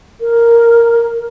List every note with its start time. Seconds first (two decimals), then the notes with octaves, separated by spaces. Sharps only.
0.21 A#4